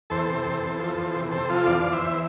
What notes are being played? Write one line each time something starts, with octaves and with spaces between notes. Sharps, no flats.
E2 A4 C5
C3
E2
E2
F3
E2
C3
C3 A4 C5
F3 F4 A4
E2 D5 F5
E2
C5 E5
E2
C5